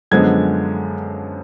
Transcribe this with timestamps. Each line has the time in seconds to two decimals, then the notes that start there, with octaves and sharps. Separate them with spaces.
0.11 F#2 D3 F3 G#3 B3 G#6